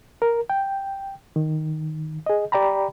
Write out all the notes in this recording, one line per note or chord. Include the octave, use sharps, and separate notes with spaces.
A#4
G5
D#3
G#4 D#5
G4 D5 G5 A#5 B5